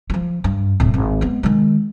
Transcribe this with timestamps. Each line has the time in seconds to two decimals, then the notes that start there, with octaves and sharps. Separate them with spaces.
0.10 F3 F#3
0.44 G2
0.80 D1 A2
0.94 G#1
1.21 G#3 B3
1.43 D#3 G#3